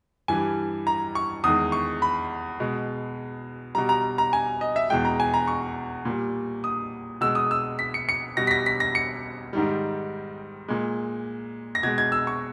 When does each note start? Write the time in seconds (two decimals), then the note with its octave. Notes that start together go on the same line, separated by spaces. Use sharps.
0.28 G2 E3 G3 G#5
0.87 A#5
1.15 C#6
1.44 E2 D#3 G#3 D#6
1.72 C#6
2.02 B5
2.60 B2 G#3
3.75 B2 G3 A#5
3.89 A#5
4.18 A#5
4.33 G#5
4.61 D#5
4.76 E5
4.90 E2 B2 G#3 G5
5.05 A#5
5.20 G#5
5.34 A#5
5.48 C#6
6.05 A#2 G3
6.64 D#6
7.21 B2 G#3 E6
7.35 D#6
7.51 E6
7.79 B6
7.94 C#7
8.09 C#7
8.37 B2 G3 A#6
8.47 B6
8.51 A#6
8.66 B6
8.80 A#6
8.95 C#7
9.53 G#2 D#3 G3
10.68 A#2 G#3
11.75 A#6
11.83 B2 G#3 G#6
11.98 G#6
12.12 E6
12.27 C#6